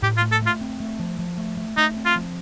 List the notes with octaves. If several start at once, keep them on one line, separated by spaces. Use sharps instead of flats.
A2 G4
F4
A3
A4
A3 F4
C4
A3
F3
F3
A3
A3
A3 D#4
C4
F4
F3